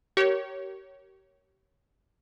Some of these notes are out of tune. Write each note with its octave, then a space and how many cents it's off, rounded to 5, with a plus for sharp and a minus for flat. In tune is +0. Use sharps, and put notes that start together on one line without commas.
G4 -35 A#4 +0 C#5 +0